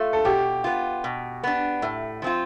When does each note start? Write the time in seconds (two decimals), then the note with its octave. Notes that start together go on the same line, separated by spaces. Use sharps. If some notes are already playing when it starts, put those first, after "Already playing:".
Already playing: A3 F4
0.13 A4
0.25 B2 G4
0.64 B3 F4
1.04 B2
1.44 B3 D4
1.82 A2
2.22 F3 C4 F4